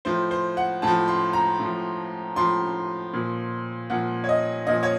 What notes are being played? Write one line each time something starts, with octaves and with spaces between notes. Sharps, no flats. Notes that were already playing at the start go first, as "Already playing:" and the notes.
A2 F3 C5
C5
F#5
A2 F3 A5
C6
A#5
A2 F3
A2 F3 C6
A#2 F3
A#2 F3 F#5
C#5
D#5
A#2 F3 D#5
C#5